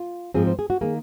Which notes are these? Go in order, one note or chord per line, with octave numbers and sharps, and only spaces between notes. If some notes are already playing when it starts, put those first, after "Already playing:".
Already playing: F4
G#2 F3 C4 G#4
C5
G#4
F#4
D#3 A#3 G#4